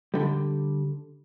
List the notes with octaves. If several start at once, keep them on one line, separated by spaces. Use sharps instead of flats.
D3 G3